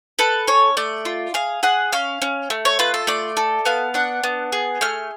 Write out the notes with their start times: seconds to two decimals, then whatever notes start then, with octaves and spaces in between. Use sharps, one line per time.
0.19 A4 B4
0.47 C#4 C#5
0.77 A3 D5
1.05 F4
1.34 G#4 F5
1.63 G#4 F#5
1.93 C#4 F5
2.22 C#4
2.50 A3
2.65 C#5
2.79 F4 B4
2.94 A4
3.07 A3 D5
3.37 A4
3.65 B3 F5
3.94 D4 F#5
4.23 B3
4.52 G#4
4.81 A3 F6